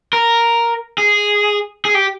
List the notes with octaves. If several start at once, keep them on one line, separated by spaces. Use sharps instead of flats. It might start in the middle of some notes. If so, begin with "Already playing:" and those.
A#4
G#4
G#4
G4